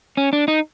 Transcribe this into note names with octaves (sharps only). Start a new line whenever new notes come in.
C#4
D4
D#4